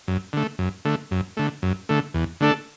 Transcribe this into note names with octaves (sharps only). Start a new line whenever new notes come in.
F#2
D3 A3
F#2
D3 A3
F#2
D3 A3
F#2
D3 A3
E2
D3 A3 D4 A4